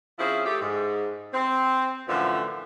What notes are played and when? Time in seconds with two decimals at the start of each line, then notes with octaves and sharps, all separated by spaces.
0.19 F3 C4 C#4 E4 G#4
0.45 A3 G4
0.61 G#2
1.34 C4
2.08 F#2 A2 D3 E3 F3